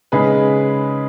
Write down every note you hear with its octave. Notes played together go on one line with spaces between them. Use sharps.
C#3 G#3 D#4 G#4 B4